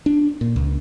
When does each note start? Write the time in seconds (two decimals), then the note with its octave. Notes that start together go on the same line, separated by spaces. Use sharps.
0.06 D4
0.41 A#2
0.56 C#2